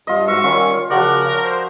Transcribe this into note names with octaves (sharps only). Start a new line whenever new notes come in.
G2 F4 D#5
G#2 F#4 E5 C#6
D#3 G3 C#4 F4
C#3 F3 F#4 A#4 D5 F#6
C5